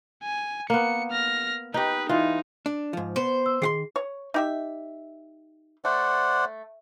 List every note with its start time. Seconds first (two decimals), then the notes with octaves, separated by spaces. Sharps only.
0.23 G#5
0.70 A#3 B3 C#7
1.12 F6 A#6
1.74 D#4 G4 B4
2.09 E3 D#4 F4
2.66 D4
2.93 G#2 F3
3.16 B3 C5
3.46 E6
3.62 D#3 G#4 F#5 C6 C7
3.96 C#5
4.34 D#4 G4 E5
5.85 A3 C5 D5 F#5